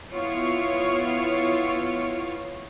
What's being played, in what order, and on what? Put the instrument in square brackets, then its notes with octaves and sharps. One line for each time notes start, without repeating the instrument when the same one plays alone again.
[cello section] B3 E4 F4 C#5